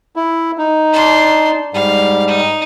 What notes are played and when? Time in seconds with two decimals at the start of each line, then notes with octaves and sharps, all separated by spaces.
0.16 E4
0.58 D#4
0.93 D4 C6
1.74 G#2 G3 F5
2.27 D#4